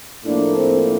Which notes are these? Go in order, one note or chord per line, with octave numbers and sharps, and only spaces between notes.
A2 F3 A#3 D4
C4